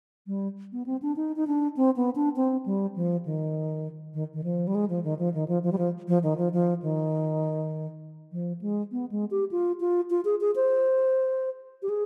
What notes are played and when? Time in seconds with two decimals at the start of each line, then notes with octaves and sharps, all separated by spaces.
0.27 G3
0.72 B3
0.86 C4
1.02 D4
1.16 D#4
1.36 D#4
1.47 D4
1.77 C4
1.96 B3
2.15 D4
2.36 C4
2.66 G3
2.96 F3
3.25 D#3
4.14 D#3
4.33 D#3
4.44 F3
4.67 G3
4.75 G#3
4.89 F3
5.04 D#3
5.19 F3
5.34 D#3
5.48 F3
5.63 F3
5.72 G3
5.78 F3
6.08 F3
6.23 D#3
6.38 F3
6.53 F3
6.82 D#3
8.32 F3
8.61 G#3
8.92 B3
9.12 G#3
9.31 G4
9.51 F4
9.80 F4
10.10 F4
10.25 G#4
10.41 G#4
10.56 C5
11.82 G4
11.89 G#4